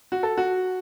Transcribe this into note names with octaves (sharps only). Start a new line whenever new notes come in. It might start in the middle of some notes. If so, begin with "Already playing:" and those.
F#4
A4
F#4